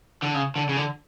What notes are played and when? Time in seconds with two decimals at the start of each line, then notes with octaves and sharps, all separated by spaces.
0.22 D3
0.34 C#3
0.56 D3
0.69 C#3
0.77 D3